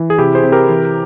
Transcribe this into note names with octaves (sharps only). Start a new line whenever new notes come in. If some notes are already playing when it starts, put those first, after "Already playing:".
Already playing: E3
G#4
C3 E4 G4
G#4 C5
C3
G4 A#4
E3